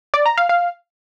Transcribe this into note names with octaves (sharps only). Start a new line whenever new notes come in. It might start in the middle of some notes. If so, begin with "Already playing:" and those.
D5
A#5
F5
F5